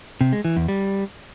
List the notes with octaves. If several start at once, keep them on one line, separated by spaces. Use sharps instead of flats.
C3
G#3
E3
E2
G3